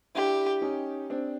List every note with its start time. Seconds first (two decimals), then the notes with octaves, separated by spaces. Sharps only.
0.15 D4 E4 G4
0.62 C#4 D#4
1.10 C4 D4